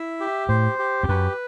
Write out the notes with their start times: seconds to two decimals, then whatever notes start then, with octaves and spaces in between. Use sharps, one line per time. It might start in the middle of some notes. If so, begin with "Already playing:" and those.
Already playing: E4 E5
0.20 G4
0.49 A2 C5
0.79 G4
1.03 E2
1.08 F#2 B4